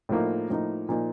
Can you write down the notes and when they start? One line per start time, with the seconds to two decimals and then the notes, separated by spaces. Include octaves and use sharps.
0.09 A2 F3 A#3 D#4
0.50 A2 F3 A#3 D#4
0.89 A#2 F3 A#3 D#4